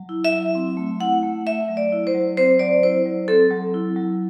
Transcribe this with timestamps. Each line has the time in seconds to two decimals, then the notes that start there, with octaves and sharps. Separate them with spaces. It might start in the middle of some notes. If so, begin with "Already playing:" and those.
Already playing: F#3
0.09 E4
0.25 E5
0.32 F#3
0.55 C4
0.77 A3
1.00 E4 F#5
1.23 A3
1.46 A3 E5
1.68 F#3
1.77 D5
1.92 E4
2.07 C5
2.15 F#3
2.37 C4 C5
2.59 F#3 D5
2.83 E4 C5
3.06 F#3
3.28 C4 A4
3.51 F#3
3.74 E4
3.96 F#3